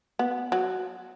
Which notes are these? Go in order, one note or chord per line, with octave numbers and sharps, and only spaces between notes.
B3
F#3